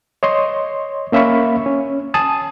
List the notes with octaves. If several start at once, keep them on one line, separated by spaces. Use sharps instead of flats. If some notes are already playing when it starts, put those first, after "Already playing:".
C#5 D#5 C6
A#3 C#4 E5 F5 B5 C#6
C#4
G#5 A5 D#6